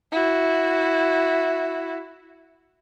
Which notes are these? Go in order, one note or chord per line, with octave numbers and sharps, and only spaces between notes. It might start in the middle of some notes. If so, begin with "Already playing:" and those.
E4 F#4